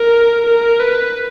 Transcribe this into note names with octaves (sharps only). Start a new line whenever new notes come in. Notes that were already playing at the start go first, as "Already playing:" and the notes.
Already playing: A#4
A#4
B4